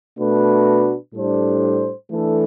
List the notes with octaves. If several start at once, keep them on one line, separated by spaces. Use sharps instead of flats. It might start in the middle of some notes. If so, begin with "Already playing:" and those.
B2 A3 D4 F#4 B4
A2 G3 D4 A4 C5
E3 A3 D4 A4